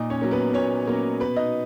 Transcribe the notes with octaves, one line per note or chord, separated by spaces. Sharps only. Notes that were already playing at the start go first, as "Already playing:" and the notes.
Already playing: A#2 D#4 D#5
C#4 C#5
F#3 A#3 C#4
B3 B4
A#2 C#4 C#5
F#3 A#3 C#4
B2 B3 B4
D#4 D#5